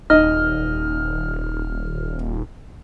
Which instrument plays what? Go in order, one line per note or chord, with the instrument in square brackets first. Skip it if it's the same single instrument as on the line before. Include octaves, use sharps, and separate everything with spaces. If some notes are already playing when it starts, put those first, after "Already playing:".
[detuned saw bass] D#1 [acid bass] D#4 [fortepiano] D#5 [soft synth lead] F6